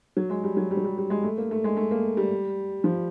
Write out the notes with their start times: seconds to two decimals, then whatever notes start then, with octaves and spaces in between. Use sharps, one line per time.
0.17 F#3
0.30 G#3
0.44 G3
0.57 F#3
0.71 G3
0.77 F#3
0.84 G3
0.98 G3
1.10 G#3
1.24 A3
1.38 A#3
1.51 A3
1.64 G#3
1.77 A3
1.91 A#3
2.17 G3
2.84 F3